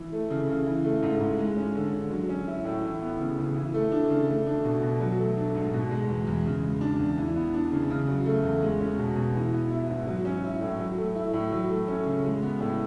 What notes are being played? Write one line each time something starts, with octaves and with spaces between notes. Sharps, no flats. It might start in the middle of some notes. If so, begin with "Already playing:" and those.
Already playing: E3
A3
C#3
C#3
E3
A3
G#2
G#2
G#3
C#4
D3
D3
F#3
C#4
E4
A2
E3
B3
C#3
C#3
E3
A3
D4
C#3
A3
D4
B2
B2
F#3
A3
D4
G#2
B2
G#3
E2
E2
C#3
G#3
D4
E2
E3
B3
D4
C#3
C#3
F#3
A3
E2
G#3
C#4
B2
B2
E3
B3
E4
G#2
F#3
C#4
E4
A2
F#3
A3
E4
A2
F#3
A3
C#4
C#3
G#3
B3
A2